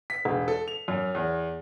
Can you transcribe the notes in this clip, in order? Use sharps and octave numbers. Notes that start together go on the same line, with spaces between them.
B6
E1
A4
F7
F#2
E2